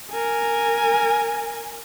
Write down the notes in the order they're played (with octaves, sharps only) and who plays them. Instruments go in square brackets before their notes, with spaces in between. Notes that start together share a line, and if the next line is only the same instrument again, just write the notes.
[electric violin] A#4 G#5